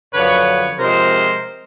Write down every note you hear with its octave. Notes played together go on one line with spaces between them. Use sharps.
F#2 D3 F3 B4 C#5
C3 F3 G#3 A#4 C5